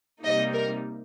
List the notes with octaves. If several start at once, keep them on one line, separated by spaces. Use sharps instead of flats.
C3 G3 A#3 D#4 D#5
A#4